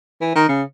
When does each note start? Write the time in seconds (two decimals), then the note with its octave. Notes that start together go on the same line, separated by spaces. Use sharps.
0.21 E3
0.35 D#3
0.49 C#3